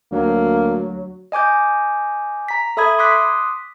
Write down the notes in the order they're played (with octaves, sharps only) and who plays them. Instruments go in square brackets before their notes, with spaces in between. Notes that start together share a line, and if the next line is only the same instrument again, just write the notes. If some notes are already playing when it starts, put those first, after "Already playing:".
[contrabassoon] D2 [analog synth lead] F#3 [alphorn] A#3
[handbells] D#5 G#5 D6 G6
A#5 B6
A4 E5 B5 D#6 G#6
C6 D6 D#6 F#6 B6